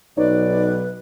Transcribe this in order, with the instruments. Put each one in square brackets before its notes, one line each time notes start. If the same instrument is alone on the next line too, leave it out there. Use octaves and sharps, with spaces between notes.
[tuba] B1 [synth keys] D#4 C#5 [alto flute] B4 [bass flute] D5